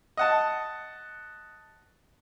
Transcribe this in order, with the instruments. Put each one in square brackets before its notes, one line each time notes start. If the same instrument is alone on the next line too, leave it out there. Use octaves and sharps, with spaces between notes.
[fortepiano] D#5 F#5 A5